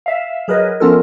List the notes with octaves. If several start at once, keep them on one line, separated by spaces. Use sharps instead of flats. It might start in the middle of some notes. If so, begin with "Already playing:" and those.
E5 F5
F#3 G#4 A#4 B4 D#5
F3 B3 C#4 F4 A4 A#4